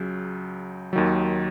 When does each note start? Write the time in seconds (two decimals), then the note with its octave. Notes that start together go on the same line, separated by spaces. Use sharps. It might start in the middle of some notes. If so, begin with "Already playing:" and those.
Already playing: C#2 C#3 F#3
0.93 D#2 D#3 F#3